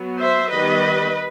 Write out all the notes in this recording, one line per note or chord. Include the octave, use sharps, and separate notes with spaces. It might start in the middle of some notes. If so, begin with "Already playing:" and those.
Already playing: F#3 B3
C5 E5
D#3 G3 B3 B4 D#5